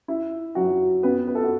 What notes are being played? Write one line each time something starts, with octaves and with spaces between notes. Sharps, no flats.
E4
F#3 F#4
B3 B4
B4
A4
F#4